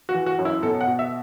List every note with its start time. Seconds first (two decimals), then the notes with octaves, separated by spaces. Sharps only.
0.09 F#4
0.14 E3
0.26 F#4
0.39 F#2
0.45 E4
0.62 B2 A4
0.81 F#5
0.87 B2
0.99 E5